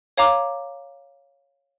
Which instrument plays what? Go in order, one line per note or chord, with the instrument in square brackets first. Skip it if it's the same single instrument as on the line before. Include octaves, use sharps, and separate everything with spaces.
[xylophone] C#5 F5 A#5 D6